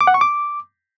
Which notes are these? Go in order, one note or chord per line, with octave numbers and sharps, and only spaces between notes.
D6
F#5
C#6
D6